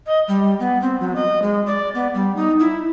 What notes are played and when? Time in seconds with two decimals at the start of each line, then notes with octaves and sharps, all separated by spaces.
0.06 D#5
0.28 G3
0.60 B3
0.82 C4
1.00 F#3
1.16 D#5
1.42 G#3
1.66 D5
1.95 B3
2.15 G3
2.36 D#4
2.60 E4